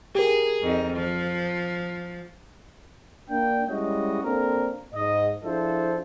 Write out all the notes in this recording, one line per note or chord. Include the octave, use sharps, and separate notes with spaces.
G4 G#4 A#4
F2 D#4
F3
A#3 D4 G5
G3 G#3 C#4 E4 F#4 D#5
A#3 C4 D4 A4 A#4
G#2 D#5
F3 D4 E4 G#4 A4 C5